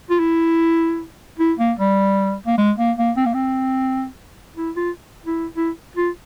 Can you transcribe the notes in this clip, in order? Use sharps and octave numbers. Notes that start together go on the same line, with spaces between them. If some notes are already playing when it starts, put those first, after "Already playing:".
F4
E4
E4
A#3
G3
A#3
G#3
A#3
A#3
C4
A#3
C4
E4
F4
E4
E4
F4